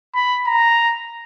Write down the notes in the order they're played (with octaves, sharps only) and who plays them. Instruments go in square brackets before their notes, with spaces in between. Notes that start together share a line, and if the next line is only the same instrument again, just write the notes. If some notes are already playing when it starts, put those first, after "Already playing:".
[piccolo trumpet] B5
A#5